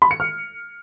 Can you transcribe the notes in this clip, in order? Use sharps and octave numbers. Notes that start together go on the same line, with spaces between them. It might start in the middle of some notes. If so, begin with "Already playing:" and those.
B5
C#7
F6